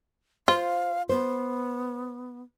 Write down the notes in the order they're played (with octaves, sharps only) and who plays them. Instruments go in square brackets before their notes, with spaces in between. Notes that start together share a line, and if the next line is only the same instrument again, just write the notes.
[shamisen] F4 [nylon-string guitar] C5 [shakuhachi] F5
[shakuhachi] B3 [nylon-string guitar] C5